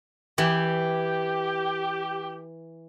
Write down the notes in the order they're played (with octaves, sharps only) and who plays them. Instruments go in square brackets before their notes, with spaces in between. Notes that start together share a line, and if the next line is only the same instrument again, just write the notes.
[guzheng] E3 [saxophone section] G4